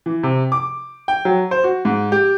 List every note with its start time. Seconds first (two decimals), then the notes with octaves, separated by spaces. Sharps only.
0.06 E3
0.23 C3
0.52 D6
1.08 G5
1.25 F#3
1.51 C5
1.64 F#4
1.85 G#2
2.12 G4